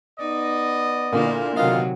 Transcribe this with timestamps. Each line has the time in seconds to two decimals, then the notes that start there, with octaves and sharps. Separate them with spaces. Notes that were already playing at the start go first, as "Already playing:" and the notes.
0.20 B3 D#4 D5 D#5
1.12 A#2 D3 A#3 E4 A#4
1.56 C3 D#3 F#3 A#3 B3 F4 D#5 F5